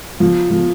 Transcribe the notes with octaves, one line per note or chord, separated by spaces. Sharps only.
F3
F3